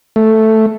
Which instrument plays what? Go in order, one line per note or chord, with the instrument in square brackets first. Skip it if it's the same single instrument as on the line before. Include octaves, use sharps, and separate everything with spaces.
[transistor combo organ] A3